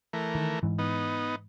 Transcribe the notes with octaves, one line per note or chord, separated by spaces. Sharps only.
E3 A3 A#4
D#3
G#2 E3
B3 D#4